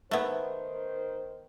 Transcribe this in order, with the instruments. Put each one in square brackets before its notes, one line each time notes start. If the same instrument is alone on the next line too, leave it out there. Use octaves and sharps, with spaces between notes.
[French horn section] D#3 C5 [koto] A3 B3